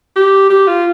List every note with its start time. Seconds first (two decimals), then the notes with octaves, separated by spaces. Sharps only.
0.16 G4
0.50 G4
0.68 F4